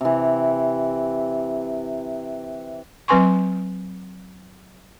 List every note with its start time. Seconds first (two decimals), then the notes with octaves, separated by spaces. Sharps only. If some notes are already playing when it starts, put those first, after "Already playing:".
0.01 C3 E3
3.08 F#3 C4 B4 G#5 C6 C#6